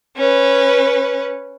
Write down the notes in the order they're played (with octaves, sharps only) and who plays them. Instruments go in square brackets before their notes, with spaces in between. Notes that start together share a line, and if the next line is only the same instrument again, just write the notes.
[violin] C#4 B4